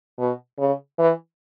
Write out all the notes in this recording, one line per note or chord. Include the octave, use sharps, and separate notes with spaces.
B2
C#3
E3